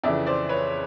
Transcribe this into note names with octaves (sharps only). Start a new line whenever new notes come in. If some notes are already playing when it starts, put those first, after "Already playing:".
F2 C#3 E3 D5 E5
C5 D5
B4 C#5